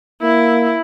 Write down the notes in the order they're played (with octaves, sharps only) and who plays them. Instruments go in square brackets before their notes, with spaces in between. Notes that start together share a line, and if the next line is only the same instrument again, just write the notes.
[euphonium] A#3 [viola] E4